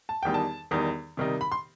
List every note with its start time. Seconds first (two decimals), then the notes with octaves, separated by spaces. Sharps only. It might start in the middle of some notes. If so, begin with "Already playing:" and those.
0.09 A5
0.23 E2 D#3 G3 D#4 G5
0.34 A5
0.71 E2 D#3 G3 D#4
1.17 C3 D#3 G3 D#4
1.41 B5
1.52 C6